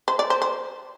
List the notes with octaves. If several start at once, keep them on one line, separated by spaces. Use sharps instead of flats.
C5
D5
C5
C5